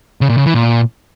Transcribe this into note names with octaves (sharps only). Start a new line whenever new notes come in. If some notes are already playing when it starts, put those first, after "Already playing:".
C#3
A#2
C#3
E3
A#2